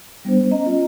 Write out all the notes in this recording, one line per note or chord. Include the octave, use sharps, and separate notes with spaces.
G3 B3 D4 C5
C#4 D#5 A#5
F4